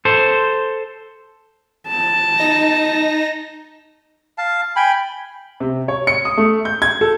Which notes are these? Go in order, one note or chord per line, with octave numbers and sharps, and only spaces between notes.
A4 C5
A5
D#4 A#6
F5 A5
G5 G#5 B5
C3
C#5
C#7
D#6
A3
G6
G#6
A4